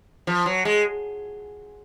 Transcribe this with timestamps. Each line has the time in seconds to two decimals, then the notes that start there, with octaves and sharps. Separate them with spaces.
0.27 F3
0.46 F#3
0.65 G#3